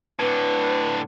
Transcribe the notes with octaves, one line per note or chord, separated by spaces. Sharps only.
A2 D3 B4